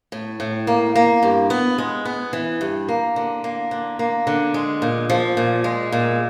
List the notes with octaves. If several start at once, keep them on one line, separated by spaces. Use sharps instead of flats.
A2
A2
A#3
A#3
G2
B3
G#3
B3
E3
G2
A#3
D3
A#3
D3
A#3
D3
G#3
A#2
F3
A#2
G#3
A#2